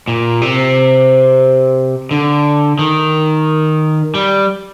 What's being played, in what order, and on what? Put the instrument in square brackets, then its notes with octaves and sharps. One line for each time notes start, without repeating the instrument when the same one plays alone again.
[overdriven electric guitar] A#2
C3
D3
D#3
G3